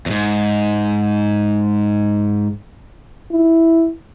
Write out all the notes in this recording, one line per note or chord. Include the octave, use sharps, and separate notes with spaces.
E2 G#2
E4